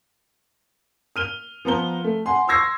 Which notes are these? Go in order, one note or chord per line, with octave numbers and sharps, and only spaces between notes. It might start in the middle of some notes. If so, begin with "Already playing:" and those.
F6 D#7 G7
F3 B3 A#5 G7
A3
F#5 G#5 C6
C6 C#6 E6 G#6 A#6 C7